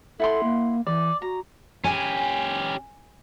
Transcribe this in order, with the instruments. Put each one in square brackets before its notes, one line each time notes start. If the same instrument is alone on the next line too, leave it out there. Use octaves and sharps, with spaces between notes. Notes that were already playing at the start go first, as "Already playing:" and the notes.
[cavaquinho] E4 F#5 C6 [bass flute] A4
[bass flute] A#3
[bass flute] E3 [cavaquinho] D5
[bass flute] F#4 [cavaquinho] A#5
[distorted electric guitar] C#4 G4 [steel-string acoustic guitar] G#5